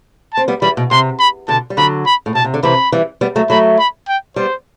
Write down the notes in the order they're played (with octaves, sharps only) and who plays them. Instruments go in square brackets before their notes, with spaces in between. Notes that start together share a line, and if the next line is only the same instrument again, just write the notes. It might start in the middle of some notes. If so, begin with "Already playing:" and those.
[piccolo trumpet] A5
[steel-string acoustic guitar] C4
G3 B3
[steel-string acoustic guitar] E3 G3 [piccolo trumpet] B5
[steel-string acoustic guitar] B2
[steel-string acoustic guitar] C3 [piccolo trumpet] C6
[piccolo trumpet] B5
[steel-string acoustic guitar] B2 D3 [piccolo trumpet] A5
[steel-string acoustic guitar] G3
[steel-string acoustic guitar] D3 F#3 [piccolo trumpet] B5
[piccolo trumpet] B5
[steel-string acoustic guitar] A2
[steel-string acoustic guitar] B2 [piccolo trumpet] A5
[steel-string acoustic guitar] C3
D3
[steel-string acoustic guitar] C3 E3 [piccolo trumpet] B5
[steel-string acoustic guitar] E3 G3
G3 B3
F#3 A3
[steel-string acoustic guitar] F#3 A3 [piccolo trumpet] B5
[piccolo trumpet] B5
G5
[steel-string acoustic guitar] G3 B3 [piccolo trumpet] C5